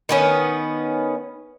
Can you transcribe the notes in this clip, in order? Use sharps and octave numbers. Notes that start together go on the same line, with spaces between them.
D#3 B3 C#4